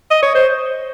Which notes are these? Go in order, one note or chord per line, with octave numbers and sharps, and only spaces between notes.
D#5
C#5
C5